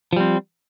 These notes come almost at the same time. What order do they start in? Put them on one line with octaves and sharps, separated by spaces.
F3 G3 C4